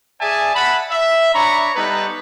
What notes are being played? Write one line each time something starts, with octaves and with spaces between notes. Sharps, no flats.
G#4 D5 E5 G#5 A5
E5 F#5 A5 B5
E5
D4 C#5 A#5 B5 C#6
G3 B3 D#4 A4 B4